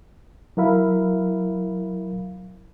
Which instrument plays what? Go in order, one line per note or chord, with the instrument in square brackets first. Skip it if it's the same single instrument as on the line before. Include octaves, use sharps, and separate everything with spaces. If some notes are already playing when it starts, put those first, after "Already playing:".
[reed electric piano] F#3 E4 A#4 E5 F5 B5